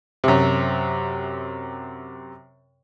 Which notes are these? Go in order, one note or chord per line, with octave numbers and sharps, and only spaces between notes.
F#2 C3